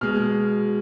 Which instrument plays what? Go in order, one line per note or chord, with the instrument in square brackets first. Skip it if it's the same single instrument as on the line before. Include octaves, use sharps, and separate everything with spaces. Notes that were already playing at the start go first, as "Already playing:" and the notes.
[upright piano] B2 G#3 F6